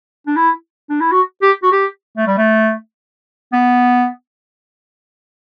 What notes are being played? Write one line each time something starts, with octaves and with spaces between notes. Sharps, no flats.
D4
E4
D4
E4
F#4
G4
F#4
G4
A3
G3
A3
B3